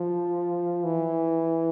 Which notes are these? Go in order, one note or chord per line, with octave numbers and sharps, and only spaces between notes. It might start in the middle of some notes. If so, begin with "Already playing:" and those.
Already playing: F3
E3